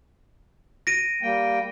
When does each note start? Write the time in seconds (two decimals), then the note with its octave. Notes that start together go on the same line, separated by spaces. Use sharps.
0.87 A#6 D7 D#7
1.22 G3 A#3 G5